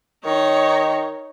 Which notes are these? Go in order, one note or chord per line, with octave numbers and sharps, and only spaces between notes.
D#3 D#4 C#5